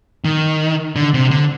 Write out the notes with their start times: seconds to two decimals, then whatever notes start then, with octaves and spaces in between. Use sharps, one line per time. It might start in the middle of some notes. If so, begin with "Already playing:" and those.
0.25 D#3
0.96 D3
1.14 C3
1.31 D3